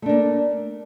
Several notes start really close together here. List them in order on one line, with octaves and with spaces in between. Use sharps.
A3 D4 A#3